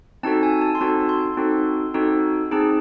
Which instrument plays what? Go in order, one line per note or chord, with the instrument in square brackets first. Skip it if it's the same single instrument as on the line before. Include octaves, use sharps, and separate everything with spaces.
[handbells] C4 D#4 F#4 A4 A5
G#5
A5
C6
C4 D#4 F#4 A4 A5
C6
C4 D#4 F#4 A4
C4 D#4 F#4 A4
C4 D#4 G#4 A5